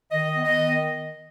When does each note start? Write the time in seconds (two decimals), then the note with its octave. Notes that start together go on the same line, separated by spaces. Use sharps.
0.11 D#3 D#5
0.34 B3
0.44 D#5
0.55 D#3